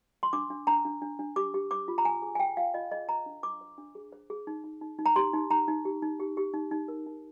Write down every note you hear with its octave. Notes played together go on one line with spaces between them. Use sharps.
C6
D4 D6
D4
D4 A#5
D4
D4
D4
G4 D6
G4
C5 D6
F4
A#5
C5 G#5
G#4
G#5
C5 G5
F4 F5
F4 D#5
G#4 D#5
C5 A#5
D4
C5 D6
C5
D4
G#4
C5
G#4
D#4
D#4
D#4
D#4
A#5
G4 C6
D#4
D#4 A#5
D#4
G4
D#4
G4
G4
D#4
D#4
A#4
D#4